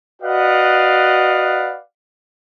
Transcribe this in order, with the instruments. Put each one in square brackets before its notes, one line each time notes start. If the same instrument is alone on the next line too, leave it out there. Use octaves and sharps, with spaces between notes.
[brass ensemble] F#4 B4 D5 D#5 F5 F#5